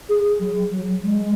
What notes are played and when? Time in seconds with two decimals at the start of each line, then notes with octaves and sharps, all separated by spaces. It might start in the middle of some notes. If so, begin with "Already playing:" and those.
0.09 G#4
0.40 F#3
0.71 F#3
1.02 G#3